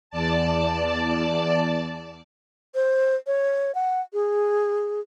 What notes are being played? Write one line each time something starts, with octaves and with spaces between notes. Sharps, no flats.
E2 D5 A5
C5
C#5
F#5
G#4